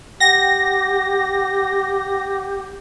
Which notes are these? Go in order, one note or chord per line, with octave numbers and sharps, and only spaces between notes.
G4 F#5 G5 A#6